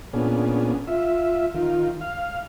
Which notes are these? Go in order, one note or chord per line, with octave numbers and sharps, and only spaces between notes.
A#2 B3 C#4 D4 G#4
F4 E5
D#3 F4
F5